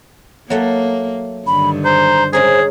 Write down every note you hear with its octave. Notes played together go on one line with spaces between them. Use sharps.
F#3 A3 A#3 F#5
G2 D3 D#3 B5
C5 A#5
G#3 C#4 G#4 A#4 C5